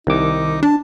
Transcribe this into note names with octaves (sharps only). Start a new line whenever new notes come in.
C2 D#3 D#4 D6
D4 A5